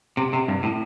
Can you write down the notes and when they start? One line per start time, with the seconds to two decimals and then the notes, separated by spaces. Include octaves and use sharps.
0.17 C3
0.33 C3
0.48 G2
0.63 A2